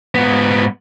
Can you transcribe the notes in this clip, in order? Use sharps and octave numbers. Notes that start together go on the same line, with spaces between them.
G#2 B3